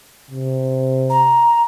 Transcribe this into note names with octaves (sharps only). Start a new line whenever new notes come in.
C3
A#5